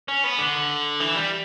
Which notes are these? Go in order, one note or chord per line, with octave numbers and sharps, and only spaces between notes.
C#4
B3
D3
E3
G3